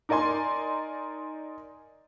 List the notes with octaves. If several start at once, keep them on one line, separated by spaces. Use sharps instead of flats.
D#4 A#4 D5 G#5 C6